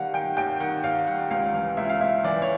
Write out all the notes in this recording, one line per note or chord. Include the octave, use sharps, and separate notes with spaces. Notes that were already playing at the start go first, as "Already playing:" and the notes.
Already playing: D#3 G3 A#3 F5 F#5
D#3 G5
D#2 G5
D#3 F#5
D#2 F5
G3 F#5
C#2 F5
E3 F5
C#2 E5
F5
C#2 E5
E3 D5
C#5